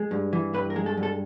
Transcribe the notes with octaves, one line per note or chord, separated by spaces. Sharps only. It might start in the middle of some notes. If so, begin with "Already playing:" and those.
Already playing: G#3
G2
E3
G2 B4
A#4
G#3
A4
G2
A4